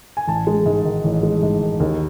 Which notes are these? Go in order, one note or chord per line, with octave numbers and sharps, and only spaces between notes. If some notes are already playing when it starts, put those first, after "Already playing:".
G#5
A1 A5
G#3
G#2
D#3
A1
G#3
G#2
D#3
D#2